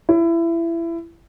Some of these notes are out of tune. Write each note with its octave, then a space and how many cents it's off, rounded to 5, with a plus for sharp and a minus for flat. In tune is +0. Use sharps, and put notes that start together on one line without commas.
E4 +25